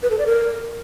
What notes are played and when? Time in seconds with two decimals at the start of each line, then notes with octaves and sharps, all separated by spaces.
0.03 B4
0.11 A4
0.19 D5
0.26 A#4